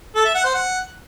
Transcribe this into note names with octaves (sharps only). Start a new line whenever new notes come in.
A4
E5
F#5
C5
F#5